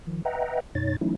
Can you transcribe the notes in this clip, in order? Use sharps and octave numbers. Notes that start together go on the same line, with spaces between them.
D#3 F3
B4 D#5 E5 F#5 G5 A#5
F#2 B2 D#4 C#5 A6
E3 F#3 A3 C#4 D#4 E4